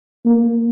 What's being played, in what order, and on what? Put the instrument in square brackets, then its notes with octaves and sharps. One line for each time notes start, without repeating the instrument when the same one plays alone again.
[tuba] A#3